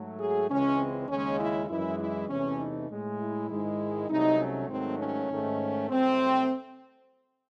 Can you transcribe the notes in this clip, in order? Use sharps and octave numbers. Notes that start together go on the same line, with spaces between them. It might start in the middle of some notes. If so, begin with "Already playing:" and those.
Already playing: G#2 F#3 A3
G#4
C#2 C#3 E3 G#3 C#4
C4
D#2 C#3 G#3 C#4
E4
F#2 E3 G#3 E4
E4
E2 C3 E3 A3 C#4
D#4
A2 G#3
E4
G#2 D#3 G#3
C2 C3 F#3 A3 D#4
C#4
G#2 D#3 F#3 A3 C4
C#4
G#2 D#3 A3
C2 C3 F#3 A3 C4